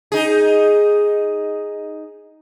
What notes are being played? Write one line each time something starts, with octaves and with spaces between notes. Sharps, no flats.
D#4 G#4